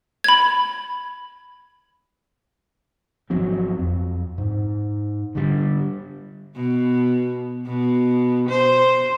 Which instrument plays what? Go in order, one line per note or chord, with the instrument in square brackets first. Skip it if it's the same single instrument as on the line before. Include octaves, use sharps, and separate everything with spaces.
[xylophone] B5 G#6
[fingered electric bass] G#1 F3 F#3 C4
F2
G#2
D3 G3
[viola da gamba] B2
B2
C5